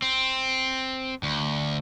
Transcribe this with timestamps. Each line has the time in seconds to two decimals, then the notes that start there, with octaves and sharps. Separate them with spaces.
0.02 C4
1.23 D2